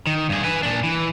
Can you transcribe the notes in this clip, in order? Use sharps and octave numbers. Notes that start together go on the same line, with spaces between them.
D#3
G2 G#4
B4 G#5
A#2 D4
E3